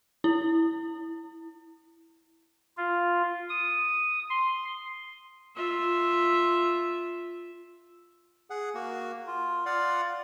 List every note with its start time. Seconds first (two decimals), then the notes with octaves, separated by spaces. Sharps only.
0.24 E4
2.77 F4
3.49 D#6
4.30 C6
5.56 F4 E5
8.50 G#4 F#5
8.75 A#3 F#4
9.27 F4
9.66 F4 D5 F5 F#5